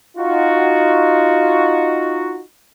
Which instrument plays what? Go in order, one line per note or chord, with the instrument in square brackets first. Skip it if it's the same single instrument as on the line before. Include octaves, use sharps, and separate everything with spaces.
[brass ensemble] D#4 F4 F#4